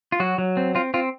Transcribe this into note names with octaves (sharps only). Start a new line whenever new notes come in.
F4
F#3 F#4
F#3
C4
C4 F4
C4 F4